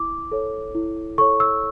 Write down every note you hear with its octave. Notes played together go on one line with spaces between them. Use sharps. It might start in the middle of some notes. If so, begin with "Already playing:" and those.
Already playing: E4 D6
A4 C#5
E4
A4 C#5 C#6
E6